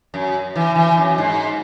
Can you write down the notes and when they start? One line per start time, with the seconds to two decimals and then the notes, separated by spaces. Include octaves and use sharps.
0.14 F#2
0.56 E3
0.75 E3
0.97 F#2
1.18 G#2